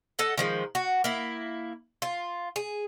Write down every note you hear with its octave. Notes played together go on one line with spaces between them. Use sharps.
A4 D#5 F#5
D#3 F3 G#3
F#4
A#3 E4
F4
G#4